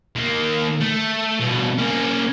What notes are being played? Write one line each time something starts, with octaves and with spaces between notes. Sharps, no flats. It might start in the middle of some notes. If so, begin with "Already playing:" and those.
D#3 A#3
A3
G2 B2
A#3 C#4